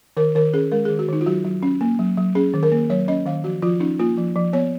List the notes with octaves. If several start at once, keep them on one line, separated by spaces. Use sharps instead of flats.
D#3 A#4
D#3 A#4
C#4 G#4
G#3 A#4
D#3 G#4
F#4
D#3 D#4
F4
F#3 F#4
F#3
C#4
A#3
F#3
F#3
C#4 G#4
D#3
A#4
A#3
F#3 C#5
C#4 D#5
D#3 F5
F3 F#4
F3 F4
C#4 D#4
A#3 F4
F3
F3
B3 C#5